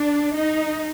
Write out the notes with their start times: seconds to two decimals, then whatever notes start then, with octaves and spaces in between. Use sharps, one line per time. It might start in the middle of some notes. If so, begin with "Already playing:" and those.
Already playing: D4
0.34 D#4